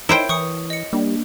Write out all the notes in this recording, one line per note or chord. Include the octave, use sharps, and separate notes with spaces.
D#4 E4 A#4 C5 C#5 G5 G6
E3 C#6 D#6 C#7
D#5 C#7
G3 A#3 D4